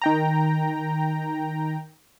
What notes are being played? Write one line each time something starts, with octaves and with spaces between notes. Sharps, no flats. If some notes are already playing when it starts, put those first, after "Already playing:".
D#3 G5 A#5